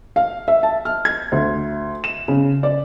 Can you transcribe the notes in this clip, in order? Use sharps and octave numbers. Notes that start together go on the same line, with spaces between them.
F5
E5
A5
F6
G#6
D2
E7
C#3
D5